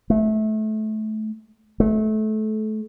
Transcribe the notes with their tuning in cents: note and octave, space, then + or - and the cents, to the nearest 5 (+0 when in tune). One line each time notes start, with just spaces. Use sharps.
A3 -25
A3 -25